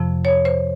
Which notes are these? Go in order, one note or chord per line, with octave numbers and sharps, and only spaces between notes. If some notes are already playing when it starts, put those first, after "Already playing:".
Already playing: F2 C3 F3
C#5
C5